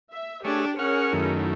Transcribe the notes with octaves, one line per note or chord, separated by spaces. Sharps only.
E5
A3 D4 G4 G#4 C#5
C#4 G#4 A#4 C#5 F#5 C#6 F6
F#2 D#3 F#3 A3 D#4 E4